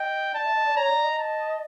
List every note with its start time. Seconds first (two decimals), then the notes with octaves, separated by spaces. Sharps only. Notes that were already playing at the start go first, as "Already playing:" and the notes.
Already playing: D#5 G5
0.34 D5 A5
0.46 E5
0.56 D#5
0.66 D5
0.76 C#5 A#5
0.90 D5
1.04 D#5
1.18 A5